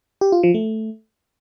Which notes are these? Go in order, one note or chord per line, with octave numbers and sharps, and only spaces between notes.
G4
F4
F3
A3